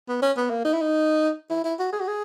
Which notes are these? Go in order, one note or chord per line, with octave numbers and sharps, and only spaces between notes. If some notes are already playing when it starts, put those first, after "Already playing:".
B3
C#4
B3
A#3
D#4
E4
D#4
E4
E4
F#4
G#4
F#4
G#4